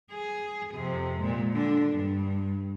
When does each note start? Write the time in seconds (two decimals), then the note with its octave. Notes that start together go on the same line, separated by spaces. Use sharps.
0.12 G#4
0.75 F2 C3
1.20 A#2 G#3
1.54 D3 D4
1.92 G2